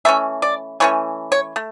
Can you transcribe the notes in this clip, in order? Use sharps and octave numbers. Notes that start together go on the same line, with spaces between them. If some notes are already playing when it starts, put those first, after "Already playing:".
E3 A3 C#4 E5
D5
E3 A3 C#4 C#5
C#5
A3